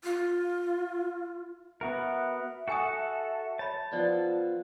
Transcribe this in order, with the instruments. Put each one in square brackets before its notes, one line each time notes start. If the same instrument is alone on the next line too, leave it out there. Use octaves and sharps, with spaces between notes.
[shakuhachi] F4
[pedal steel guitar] B3 F#4 A#4 [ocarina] E5
[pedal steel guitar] F#4 A4 [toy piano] F#5 G#5 D#6
[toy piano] C#5 B5 [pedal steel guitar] A5
[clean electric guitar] F3 B3 [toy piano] D5